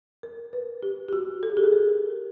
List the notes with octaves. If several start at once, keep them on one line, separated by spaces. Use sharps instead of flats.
A#4
B4
G4
G4
F#4
A4
G#4
G4
G#4
A#4